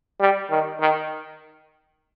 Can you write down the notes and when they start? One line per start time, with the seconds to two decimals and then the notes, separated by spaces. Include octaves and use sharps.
0.20 G3
0.50 D#3
0.80 D#3